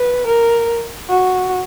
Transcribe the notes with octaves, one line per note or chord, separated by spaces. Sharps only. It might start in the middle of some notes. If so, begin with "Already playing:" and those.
Already playing: B4
A#4
F#4